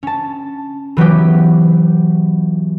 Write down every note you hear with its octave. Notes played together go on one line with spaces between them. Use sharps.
C#4 A5
E3 F#3 B3 G4